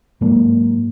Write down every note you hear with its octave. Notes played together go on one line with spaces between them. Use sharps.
G#2 F#3 A#3